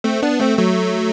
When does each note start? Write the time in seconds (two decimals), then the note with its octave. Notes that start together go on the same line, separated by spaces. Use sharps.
0.04 A3 C4
0.23 B3 D4
0.40 A3 C4
0.58 F#3 A3